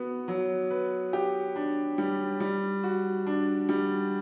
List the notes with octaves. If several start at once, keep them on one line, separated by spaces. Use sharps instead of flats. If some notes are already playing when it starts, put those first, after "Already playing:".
Already playing: B3 F#4
F#3
B4
G4
D4
G3
G3
F#4
D4
G3